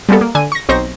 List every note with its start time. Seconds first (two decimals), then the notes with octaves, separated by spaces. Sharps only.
0.09 G3 G#3 A#3 B3 A4
0.21 A#3
0.35 D3 G#5 D#7
0.52 C#6 A#6
0.69 B1 C4 D#4 C5 C#6 A#6